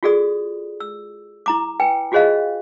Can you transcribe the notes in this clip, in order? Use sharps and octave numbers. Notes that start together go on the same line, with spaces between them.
F4 F#4 G#4 A4 D5 D#6
E6
E4 A#5 D6
B4 G5 G#5
F4 F#4 G#4 C5 D#5 F5